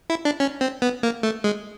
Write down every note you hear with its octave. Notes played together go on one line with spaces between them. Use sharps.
E4
D4
C#4
C4
B3
A#3
A3
G#3